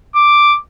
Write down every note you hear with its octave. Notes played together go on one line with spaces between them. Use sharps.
D6